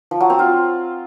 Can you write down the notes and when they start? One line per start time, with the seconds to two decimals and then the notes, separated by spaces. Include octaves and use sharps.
0.11 F3
0.20 F#3
0.30 C4
0.39 F4